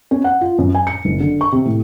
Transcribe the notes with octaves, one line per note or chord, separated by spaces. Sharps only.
C#4
F#5
F4
F#2
G#5
C#7
F#1
D3
C#6
C3
A2